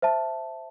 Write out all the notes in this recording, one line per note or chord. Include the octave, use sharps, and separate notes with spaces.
C5 E5 A5